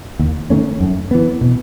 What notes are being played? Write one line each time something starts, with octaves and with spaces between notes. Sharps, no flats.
D#2
D#3 A3 C#4
F#2
E3 B3
B2